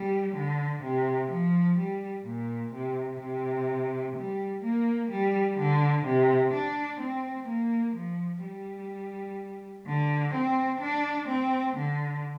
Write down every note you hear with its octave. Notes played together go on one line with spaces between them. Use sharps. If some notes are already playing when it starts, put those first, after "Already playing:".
Already playing: G3
D3
C3
F3
G3
A#2
C3
C3
G3
A#3
G3
D3
C3
D4
C4
A#3
F3
G3
D3
C4
D4
C4
D3